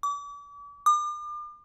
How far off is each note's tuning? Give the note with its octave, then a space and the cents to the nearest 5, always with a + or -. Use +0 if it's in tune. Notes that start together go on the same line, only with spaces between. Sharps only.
D6 -40
D6 +40